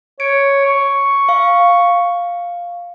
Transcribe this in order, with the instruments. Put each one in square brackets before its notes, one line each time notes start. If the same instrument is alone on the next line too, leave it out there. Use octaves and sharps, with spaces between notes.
[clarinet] C#5 [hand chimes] D7
[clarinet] C#6
[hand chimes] F5